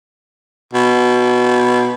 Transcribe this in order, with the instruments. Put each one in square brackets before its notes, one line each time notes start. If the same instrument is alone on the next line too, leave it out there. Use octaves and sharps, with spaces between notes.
[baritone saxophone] B2